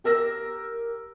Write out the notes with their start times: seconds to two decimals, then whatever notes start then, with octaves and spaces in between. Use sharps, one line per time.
0.04 G4 A#4 E6 A#6